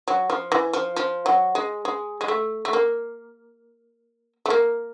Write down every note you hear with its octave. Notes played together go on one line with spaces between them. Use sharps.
F#3
F3
E3
F3
F3
F#3
G#3
G#3
G#3
A3
A3
A#3
A3
A#3